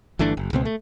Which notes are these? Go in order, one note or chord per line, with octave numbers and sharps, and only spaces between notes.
G1 E3 A3 D4
F#1
C#2 B2 C4
A3